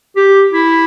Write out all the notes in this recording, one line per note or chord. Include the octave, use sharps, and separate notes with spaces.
G4
E4